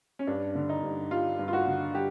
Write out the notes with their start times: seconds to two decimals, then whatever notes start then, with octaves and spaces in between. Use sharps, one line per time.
0.19 C#4
0.27 G2 D4
0.55 D3
0.69 D#4
0.83 G2
1.11 G3 F4
1.39 G2
1.48 F4
1.53 F#4
1.67 D3
1.94 G3 G4